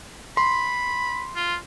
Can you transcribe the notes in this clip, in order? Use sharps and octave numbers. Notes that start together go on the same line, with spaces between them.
B5 C6
F4